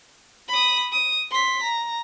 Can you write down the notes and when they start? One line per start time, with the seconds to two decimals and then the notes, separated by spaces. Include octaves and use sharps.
0.48 B5 D#6
0.92 D#6
1.31 C6 B6
1.63 A#5